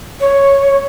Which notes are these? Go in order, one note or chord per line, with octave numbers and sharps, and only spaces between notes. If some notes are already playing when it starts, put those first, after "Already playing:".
C#5